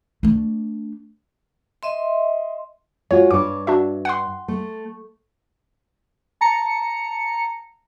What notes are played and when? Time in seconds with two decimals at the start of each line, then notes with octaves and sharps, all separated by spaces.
0.23 A3 D4
1.83 D#5 E5 C6
3.11 G#3 F4 F#4 C#5
3.31 G2 C#5 D6
3.67 D4 F#4 E5
4.05 F#5 G5 C6
4.48 A3
6.41 A5 A#5 C#7